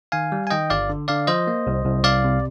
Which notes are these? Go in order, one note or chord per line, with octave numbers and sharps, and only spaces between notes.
D#3 F5 G#5
G3
G#5
D#3 D#5 G5
G1 D5 F5
D3
D3 D5 F5
F3 C5 D#5
A#3
C2
C2
C2 D5 F5
C3